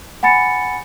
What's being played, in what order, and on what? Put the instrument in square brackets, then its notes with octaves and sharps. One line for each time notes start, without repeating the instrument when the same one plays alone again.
[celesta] F#5 G#5 B5 A6 C#7